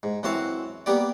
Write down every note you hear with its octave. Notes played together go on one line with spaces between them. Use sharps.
G#2
F#2 E3 C4 F#4 F5 A5
G3 A#3 B3 G4 D5